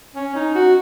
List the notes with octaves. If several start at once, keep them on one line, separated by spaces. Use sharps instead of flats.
C#4
D#4
F#4